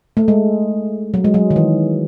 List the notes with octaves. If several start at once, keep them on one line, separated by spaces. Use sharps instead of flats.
A3
G#3
F#3
G#3
F#3
D#3
E3